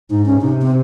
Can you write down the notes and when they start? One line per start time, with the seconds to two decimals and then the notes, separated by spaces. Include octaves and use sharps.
0.10 G#2 D#4
0.26 C#4
0.41 C3 D#4
0.61 C4